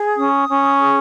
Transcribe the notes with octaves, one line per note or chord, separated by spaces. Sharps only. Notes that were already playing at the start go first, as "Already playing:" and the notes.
Already playing: G#4
C#4 D#6
C#4
G#4